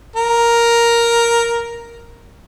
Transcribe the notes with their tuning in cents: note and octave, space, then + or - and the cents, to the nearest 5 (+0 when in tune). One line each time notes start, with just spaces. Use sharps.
A#4 +5